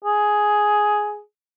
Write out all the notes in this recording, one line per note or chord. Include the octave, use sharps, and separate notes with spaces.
G#4